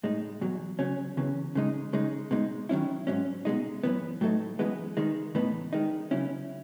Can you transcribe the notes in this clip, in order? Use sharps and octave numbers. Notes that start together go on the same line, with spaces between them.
A2 G#3 D#4
E2 B2 F#3
C#3 F#3 C#4
E2 C#3 E3
C#3 G#3 D#4
C#3 G#3 D#4
B2 G#3 D#4
D#3 F#3 C#4 E4
G#2 F#3 C#4
B2 G#3 D#4
F#2 E3 B3
A2 F#3 A3 D#4
F#2 E3 G#3 B3
D#3 G#3 D#4
A2 E3 B3 D#4
D#3 G#3 D#4
C#3 F#3 C#4 E4